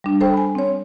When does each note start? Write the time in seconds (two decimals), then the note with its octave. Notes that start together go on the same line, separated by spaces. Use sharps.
0.04 G3 D4
0.21 A4 C5 G5
0.34 G#5 B5
0.55 C4 C#5